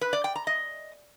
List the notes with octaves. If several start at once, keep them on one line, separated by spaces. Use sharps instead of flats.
B4
D5
G5
A#5
D#5